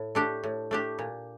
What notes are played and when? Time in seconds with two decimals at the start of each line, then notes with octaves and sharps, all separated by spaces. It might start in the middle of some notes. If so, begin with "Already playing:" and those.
Already playing: A2
0.15 A3 D4 G4
0.43 A2
0.71 A3 D4 G4
0.99 A#2